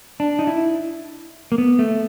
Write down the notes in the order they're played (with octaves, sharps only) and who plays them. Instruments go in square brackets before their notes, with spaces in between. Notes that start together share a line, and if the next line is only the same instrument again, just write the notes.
[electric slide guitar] D4
D#4
E4
A#3
B3
A3